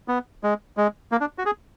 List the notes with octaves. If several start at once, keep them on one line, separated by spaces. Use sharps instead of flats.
B3
G#3
G#3
A#3
D4
F#4
G#4